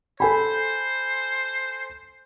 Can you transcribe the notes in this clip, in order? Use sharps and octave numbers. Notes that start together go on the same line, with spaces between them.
A4 C5 G#5 B5